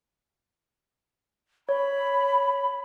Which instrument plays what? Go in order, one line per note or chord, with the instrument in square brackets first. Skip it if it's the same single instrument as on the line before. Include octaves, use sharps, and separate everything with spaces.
[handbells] C#5 [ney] B5